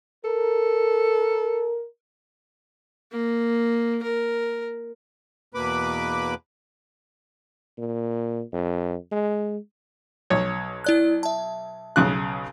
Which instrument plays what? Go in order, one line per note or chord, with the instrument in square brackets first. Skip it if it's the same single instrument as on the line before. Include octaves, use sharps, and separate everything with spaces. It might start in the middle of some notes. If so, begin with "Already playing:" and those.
[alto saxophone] A4 [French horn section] A#4
[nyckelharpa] A#3
A#4
[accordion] E2 B2 A#3 B4 B5 D6
[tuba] A#2
F2
G#3
[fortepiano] B1 C#5
[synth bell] E4 D5 F#6
E5 A5
[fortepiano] B1 C#3 F#6